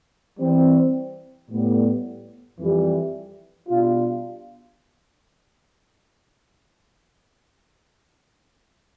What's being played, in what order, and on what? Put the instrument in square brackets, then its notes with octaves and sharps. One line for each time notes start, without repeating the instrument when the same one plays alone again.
[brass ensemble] E3 G3 C4
A2 G3 B3
F2 E3 G3
B2 G3 D4 F4